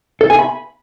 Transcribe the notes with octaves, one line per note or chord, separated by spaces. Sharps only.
A4
G#5
B5